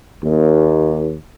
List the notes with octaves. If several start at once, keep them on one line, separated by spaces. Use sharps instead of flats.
D#2